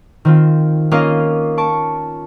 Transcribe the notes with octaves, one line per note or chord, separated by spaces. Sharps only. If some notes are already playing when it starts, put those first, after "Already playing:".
D#3 C4 F4
A#3 C#4 F4 D#5 F5
A5 C#6 D7